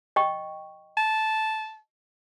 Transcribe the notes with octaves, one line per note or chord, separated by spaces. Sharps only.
D#5 G5 C#6
A5